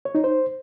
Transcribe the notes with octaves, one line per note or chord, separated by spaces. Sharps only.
C#5
D#4
C5